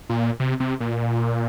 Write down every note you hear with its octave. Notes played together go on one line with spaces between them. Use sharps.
A#2
C3
C3
A#2